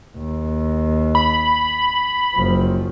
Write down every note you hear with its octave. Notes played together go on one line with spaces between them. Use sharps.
D#2
B5
F#1 F3